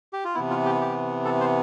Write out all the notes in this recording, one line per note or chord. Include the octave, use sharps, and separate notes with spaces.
G4
F4
C3 E3 B3 E4
F4
G4
G4
A4
C5